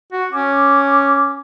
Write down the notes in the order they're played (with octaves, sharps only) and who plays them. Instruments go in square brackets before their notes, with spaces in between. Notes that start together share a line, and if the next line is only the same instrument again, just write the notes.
[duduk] F#4
[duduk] C#4 [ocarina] D6